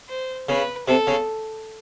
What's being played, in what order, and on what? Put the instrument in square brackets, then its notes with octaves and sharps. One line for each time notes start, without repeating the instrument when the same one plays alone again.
[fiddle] C5
[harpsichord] C#3 [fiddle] B4
[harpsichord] C3 [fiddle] A4
[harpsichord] C#3